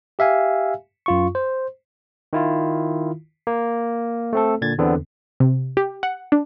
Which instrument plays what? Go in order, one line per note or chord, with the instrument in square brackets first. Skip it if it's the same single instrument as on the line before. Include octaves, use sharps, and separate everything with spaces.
[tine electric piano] G4 E5 F5 G#5
F#2 F4 C#6
C5
D#3 E4 F4
A#3
A3 C4 A4
A#2 D3 G#6 A6
E2 D3 B3 C4
[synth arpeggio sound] C3
G4
F#5
D4